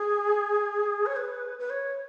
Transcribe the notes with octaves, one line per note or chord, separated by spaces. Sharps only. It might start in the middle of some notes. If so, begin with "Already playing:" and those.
Already playing: G#4
C#5
B4
B4
C#5